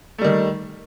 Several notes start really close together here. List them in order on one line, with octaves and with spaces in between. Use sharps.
A3 G3 D#3